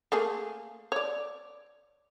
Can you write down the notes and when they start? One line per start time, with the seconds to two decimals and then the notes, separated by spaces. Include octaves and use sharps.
0.12 A3 A#3 G#4
0.92 C#5 D5